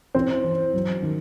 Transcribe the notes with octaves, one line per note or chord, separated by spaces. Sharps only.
E3 C4 C5
E3
F#3
D#3